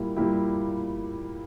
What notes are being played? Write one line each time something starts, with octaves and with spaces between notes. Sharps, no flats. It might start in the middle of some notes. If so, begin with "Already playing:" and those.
Already playing: A#2 G3 A#3 E4 G4
A#2 G3 A#3 E4 G4